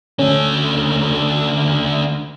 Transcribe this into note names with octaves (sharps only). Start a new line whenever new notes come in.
D3 A3 C#4